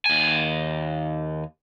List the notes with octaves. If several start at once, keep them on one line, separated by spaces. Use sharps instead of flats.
D#2 G#5